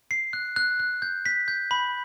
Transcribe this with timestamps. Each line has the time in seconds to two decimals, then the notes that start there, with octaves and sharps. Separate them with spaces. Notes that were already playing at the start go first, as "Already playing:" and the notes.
0.11 C7
0.33 F#6
0.56 F#6
0.80 F#6
1.02 G6
1.26 B6
1.48 G6
1.71 B5